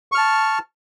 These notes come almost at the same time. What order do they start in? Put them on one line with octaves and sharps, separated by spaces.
C#6 F6 A5